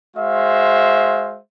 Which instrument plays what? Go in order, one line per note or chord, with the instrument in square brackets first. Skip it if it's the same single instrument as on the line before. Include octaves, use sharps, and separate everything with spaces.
[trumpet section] G#3 F#4 C5 E5 F5